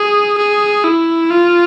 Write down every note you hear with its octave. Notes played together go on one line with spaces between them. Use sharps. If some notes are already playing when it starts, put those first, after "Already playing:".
Already playing: G#4
G#4
E4
F4